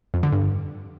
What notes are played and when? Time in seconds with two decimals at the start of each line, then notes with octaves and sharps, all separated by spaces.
0.14 F2
0.23 D3
0.32 G2